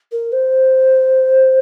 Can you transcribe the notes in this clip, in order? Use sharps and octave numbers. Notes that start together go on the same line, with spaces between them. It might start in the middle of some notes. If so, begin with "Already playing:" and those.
A#4
C5